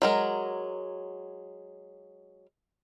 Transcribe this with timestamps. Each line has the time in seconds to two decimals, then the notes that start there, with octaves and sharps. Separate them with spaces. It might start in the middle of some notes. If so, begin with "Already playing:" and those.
0.02 F#3 G#3 A#4